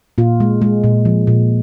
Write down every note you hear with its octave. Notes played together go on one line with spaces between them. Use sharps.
A#2 F4
G#3
G#3
A#2
F3
A#2